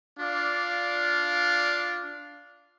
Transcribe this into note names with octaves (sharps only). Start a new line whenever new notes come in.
D4 F4 D5 F5